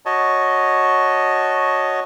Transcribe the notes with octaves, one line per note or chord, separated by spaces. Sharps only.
F#4 C#5 D#5 A5